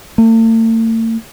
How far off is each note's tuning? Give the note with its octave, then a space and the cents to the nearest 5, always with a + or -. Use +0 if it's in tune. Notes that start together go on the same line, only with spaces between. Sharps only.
A3 +45